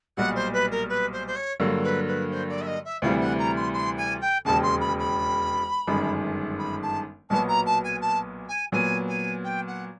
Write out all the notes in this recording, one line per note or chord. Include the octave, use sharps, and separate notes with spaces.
B1 A#2 G3 F#5
C5
B4
A#4
B4
C5
C5
C#5
G2 D3 F#3 A#3
B4
B4
C5
D5
E5
D#5
E5
D2 C3 E3 G3 F5
F#5
A#5
C6
C6
G#5
G5
E1 D#2 C#3 A5
C6
B5
B5
G1 F#2 D#3 G#3
B5
A5
B1 A#2 F#3 B3 A5
A#5
A5
G#5
A5
G#5
A#2 F#3 B3 G#5
G#5
G5
F#5